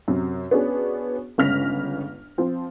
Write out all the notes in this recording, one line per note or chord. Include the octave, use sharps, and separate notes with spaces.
F#2 C3
B3 C#4 D4 F#4 G#4
G1 C#3 G#3 F6 A#6 B6
F3 C4